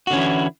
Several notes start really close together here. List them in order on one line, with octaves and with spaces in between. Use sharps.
F#4 D3 C#4 E3 E4